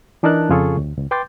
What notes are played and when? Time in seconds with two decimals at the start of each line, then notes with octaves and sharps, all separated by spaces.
0.23 E3 D4 D#4 A#4 A5 F#6
0.49 F2 C#3 F4 G#4 A4 C#6
0.77 D2
0.97 C#2
1.11 B4 G5 C6 D6 G6 A6